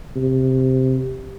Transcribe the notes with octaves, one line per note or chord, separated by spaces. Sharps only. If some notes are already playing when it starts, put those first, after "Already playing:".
C3